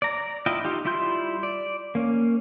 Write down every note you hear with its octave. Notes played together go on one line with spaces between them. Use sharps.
D5 A#5
E4 F4 D#5 G5
D#4 F4 G4
G3 E4 F4 C6 G6
D5
A#3 C#4